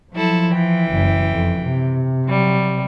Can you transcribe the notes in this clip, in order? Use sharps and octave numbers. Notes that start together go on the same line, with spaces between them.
F3 F#3 E4 A4
E3 G5
F#1
F2
C3
F#3 G3